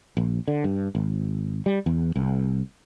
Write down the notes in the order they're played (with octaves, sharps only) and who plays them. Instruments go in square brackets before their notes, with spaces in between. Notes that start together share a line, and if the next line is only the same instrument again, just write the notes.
[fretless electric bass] A#1
D3
G2
G#1
G3
E2
C2